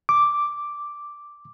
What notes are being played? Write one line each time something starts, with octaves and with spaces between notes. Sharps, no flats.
D6